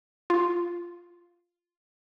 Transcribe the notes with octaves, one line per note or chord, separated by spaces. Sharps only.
F4